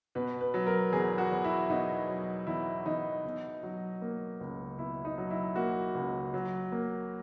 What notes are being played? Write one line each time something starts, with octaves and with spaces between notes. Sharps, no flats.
B2 B4
B4
F#3
A#4
E2 G#4
F#4
E2
E4
B2 D#4
F#3
E2 E4
E2 D#4
B2
F#3
A#3
C#2
B2 E4
D#4
F#3
E4
A#3 F#4
C#2
F#3
A#3